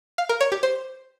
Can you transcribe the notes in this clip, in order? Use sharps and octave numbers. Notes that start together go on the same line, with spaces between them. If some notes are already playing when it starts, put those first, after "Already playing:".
F5
A#4
C#5
G4
C5